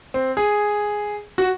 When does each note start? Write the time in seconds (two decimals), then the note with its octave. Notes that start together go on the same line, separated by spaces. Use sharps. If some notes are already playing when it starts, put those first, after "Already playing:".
0.14 C4
0.37 G#4
1.38 F#4